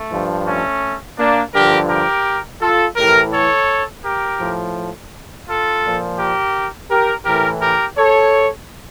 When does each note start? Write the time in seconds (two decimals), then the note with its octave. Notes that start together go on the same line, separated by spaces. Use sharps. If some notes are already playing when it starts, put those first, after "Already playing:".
Already playing: A3
0.11 G2 F3
0.47 A3 C#4
1.17 A#3 D4
1.53 G2 D3 F3 G4 A#4
1.89 G4 A#4
2.61 F4 A4
2.96 A2 E3 G4 A#4
3.33 A4 C#5
4.04 G4 A#4
4.40 A2 F3
5.48 F4 A4
5.83 A#2 F3
6.19 G4 A#4
6.90 G4 A#4
7.25 A2 E3 G4 A#4
7.61 G4 A#4
7.98 A4 C#5